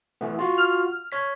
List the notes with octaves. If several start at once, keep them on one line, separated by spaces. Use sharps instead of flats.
E3 A3 B3
F4 F#4
F6
C#5 B6